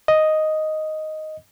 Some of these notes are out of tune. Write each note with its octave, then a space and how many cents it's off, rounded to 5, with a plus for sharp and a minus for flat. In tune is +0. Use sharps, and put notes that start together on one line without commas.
D#5 +0